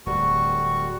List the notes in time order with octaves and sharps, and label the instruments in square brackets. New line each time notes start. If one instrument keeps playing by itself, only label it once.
[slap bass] D1 [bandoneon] G3 F#4 C#6